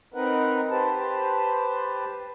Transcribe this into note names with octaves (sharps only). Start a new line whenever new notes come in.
C4 D#4 A#4 B4 F#5
G4 B4 C5 A5